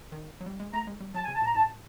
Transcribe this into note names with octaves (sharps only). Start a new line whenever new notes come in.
D#3
F#3
G3
G#3
A3 A#5
G#3
G3
F#3 A5
G#5
C#3
A5
A#2 A#5
A2 A5